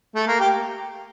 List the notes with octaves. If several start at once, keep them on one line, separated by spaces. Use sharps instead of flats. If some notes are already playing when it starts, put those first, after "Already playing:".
A3
A#3
G4